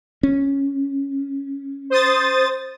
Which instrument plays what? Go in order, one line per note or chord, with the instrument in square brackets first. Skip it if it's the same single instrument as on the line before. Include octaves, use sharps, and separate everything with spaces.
[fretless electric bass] C#4
[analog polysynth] C5 D#6 A6